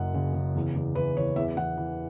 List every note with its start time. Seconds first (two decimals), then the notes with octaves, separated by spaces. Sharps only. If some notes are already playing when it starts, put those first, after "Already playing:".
Already playing: F#1 F#2 F#5
0.14 C#3
0.34 C#3
0.55 E2
0.76 E2
0.95 E3 B4
1.17 E3 C#5
1.36 E2 E5
1.57 E2 F#5
1.77 E3